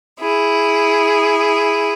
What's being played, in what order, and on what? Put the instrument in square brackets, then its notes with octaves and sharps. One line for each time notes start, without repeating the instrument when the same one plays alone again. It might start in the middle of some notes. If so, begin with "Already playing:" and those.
[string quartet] E4 G#4